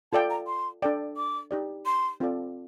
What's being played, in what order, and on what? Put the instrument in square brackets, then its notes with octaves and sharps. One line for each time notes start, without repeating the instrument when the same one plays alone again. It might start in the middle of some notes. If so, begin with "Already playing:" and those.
[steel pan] F4 A4 D5 G5 [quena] A5
[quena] A#5
C6
[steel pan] D4 A4 D5 G5
[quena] D6
[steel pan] D#4 G4 D5
[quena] C6
[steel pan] C4 F4 A4 D5